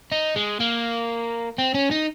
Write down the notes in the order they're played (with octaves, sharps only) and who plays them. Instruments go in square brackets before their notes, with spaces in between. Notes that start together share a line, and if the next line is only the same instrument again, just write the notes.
[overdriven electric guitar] D#4
G#3
A#3
C4
C#4
D#4